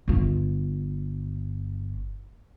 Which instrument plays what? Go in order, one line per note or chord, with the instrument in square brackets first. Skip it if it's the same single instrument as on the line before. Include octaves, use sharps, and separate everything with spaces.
[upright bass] G1 F4